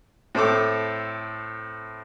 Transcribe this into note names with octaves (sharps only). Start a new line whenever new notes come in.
A2 C4 A4 D6